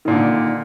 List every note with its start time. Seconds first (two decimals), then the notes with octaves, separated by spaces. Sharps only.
0.05 D#3
0.08 A#2
0.10 D3